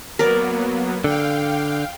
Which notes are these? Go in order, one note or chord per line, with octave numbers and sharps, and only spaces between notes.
F#3 A#3 B3 A#4 D5
D3 F5 G5